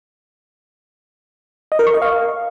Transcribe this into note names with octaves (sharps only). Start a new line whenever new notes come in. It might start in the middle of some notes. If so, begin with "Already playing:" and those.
D#5
A#4
C#6
D#5
F5